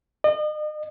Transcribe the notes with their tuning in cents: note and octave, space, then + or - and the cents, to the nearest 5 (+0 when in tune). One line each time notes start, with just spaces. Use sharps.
D#5 -40